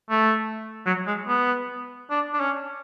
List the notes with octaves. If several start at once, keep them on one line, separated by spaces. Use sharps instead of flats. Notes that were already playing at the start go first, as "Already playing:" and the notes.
A3
F#3
G#3
B3
D4
D4
C#4